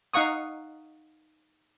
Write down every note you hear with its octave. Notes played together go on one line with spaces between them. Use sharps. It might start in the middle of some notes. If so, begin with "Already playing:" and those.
D#4 F5 F#5 C#6 D#6